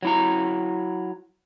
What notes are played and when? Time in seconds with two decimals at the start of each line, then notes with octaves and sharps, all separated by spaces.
0.03 F#3 E4 A#5